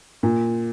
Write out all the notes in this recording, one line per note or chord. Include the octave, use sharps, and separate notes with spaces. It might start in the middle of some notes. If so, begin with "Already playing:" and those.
A#2